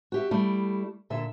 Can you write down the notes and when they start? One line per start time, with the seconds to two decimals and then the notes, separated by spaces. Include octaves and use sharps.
0.12 F#4 G4 E5
0.31 G3 A3 E4
1.10 A#2 D3 E5